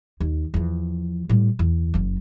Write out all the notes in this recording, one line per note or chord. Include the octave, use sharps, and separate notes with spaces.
D#2
E2 F3
A2 G3
E2
F#1 F#2